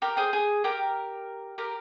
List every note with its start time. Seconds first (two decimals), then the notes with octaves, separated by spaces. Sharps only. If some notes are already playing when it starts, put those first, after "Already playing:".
0.02 G4 A#4
0.17 G#4 C5
0.33 G#4
0.64 G4 A#4
1.58 G4 A#4